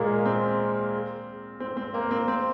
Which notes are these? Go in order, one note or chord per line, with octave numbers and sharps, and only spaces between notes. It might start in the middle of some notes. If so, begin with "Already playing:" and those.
Already playing: A#2 G#3 A#3
C4
C4
C4
A#3
C4
C4